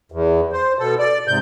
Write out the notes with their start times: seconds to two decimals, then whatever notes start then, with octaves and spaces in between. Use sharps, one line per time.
0.12 E2
0.52 C5
0.79 B2 A4
0.99 D5
1.28 G#2 C3 G6